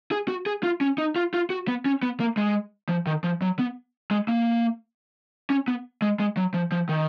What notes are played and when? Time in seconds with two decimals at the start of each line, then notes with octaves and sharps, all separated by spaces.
0.11 G#4
0.28 F#4
0.46 G#4
0.63 F4
0.81 C#4
0.98 D#4
1.16 F4
1.34 F4
1.50 F#4
1.68 B3
1.86 C#4
2.03 B3
2.20 A#3
2.37 G#3
2.89 F3
3.07 D#3
3.24 F3
3.42 F#3
3.59 B3
4.11 G#3
4.28 A#3
5.50 C#4
5.68 B3
6.02 G#3
6.19 G#3
6.37 F#3
6.54 F3
6.72 F3
6.89 D#3